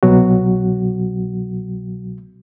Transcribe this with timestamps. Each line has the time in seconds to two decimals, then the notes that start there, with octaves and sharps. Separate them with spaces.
0.03 C2 B2 F#3 F#4